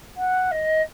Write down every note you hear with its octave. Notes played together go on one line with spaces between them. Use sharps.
F#5
D#5